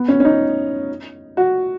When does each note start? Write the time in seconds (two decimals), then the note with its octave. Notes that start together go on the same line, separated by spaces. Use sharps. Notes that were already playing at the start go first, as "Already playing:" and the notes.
Already playing: B3
0.08 C#4
0.20 C#4
0.25 D#4
1.37 F#4